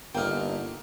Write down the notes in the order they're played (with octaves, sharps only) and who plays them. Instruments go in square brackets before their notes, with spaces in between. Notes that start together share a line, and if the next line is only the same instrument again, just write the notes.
[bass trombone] G1 [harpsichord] A#3 D#4 [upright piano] G5 F6